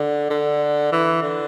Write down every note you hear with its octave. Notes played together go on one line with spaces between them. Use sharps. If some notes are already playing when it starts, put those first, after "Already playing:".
Already playing: D3
D3
E3
D3